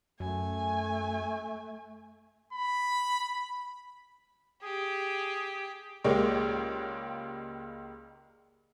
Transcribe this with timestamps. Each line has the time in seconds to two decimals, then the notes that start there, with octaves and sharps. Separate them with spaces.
0.20 F#2 A3 G#5
2.53 B5
4.63 G4 G#4
6.04 C#2 G#3 A#3 G4 C#5 D5